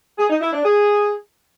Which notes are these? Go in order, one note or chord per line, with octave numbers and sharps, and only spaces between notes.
G#4
D#4
E4
D4
G#4